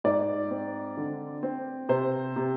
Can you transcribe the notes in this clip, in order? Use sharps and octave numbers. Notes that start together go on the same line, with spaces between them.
G#2 D5
C4
D3
C4
C3 C5
C3